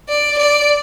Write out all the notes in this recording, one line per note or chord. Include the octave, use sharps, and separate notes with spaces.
D5
D5